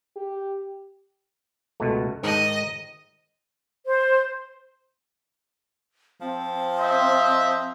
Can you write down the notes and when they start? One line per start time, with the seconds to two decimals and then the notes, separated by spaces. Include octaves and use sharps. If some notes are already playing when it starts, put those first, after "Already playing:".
0.16 G4
1.80 C#2 B2 A3
2.23 G#2 D#3 D#4 D#5
3.86 C5
6.21 F3 C4
6.79 C5 D#5 E5